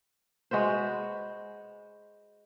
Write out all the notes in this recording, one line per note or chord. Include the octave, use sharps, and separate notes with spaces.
G#3 F#4 B4 C5